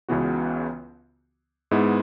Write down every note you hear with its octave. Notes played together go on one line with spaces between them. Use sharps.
C#2 C#3 E3 B3 F#4
G#2 G#3 B3 E4